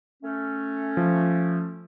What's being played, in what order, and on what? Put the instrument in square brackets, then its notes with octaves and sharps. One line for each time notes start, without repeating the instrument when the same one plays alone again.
[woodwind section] A3 C#4
[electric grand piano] F3